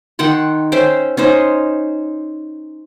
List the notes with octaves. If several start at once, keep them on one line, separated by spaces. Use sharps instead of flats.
D#3 F#5 G5 C6
C#4 C5 E5 G5
C#4 D#4 C5